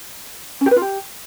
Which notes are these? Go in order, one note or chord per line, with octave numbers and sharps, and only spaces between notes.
C#4
G4
B4
F4
G4